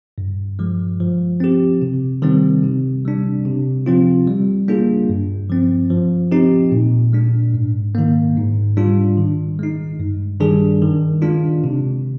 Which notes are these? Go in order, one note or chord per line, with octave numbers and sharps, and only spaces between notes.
G2
F3 G#3
F3
C4 G4
C3
D#3 G3 C4
C3
G3 D4
C3
F3 C4 F4
G3
A#3 D4 F4 G#4
G2
F3 C4
F3
C4 D#4 G4
A#2
G#3 D4
G#2
D#3 A#3
G#2
G3 D4 F4
D#3
G#3 D#4
G2
D#3 G3 D4 G#4
D#3
G#3 D4 F4
C3